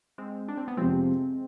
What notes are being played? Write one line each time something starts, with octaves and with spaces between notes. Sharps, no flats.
G#3 C4
D4
C4
B3
F2 C3 F3 G#3 C4